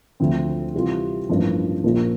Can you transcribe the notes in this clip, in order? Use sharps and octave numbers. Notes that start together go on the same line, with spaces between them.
D2 D3 F3 C4
C3 E3 G3 C4 F4
A1 G2 F3 A#3
A#1 A#2 F3 A#3